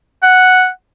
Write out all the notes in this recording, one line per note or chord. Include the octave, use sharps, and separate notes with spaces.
F#5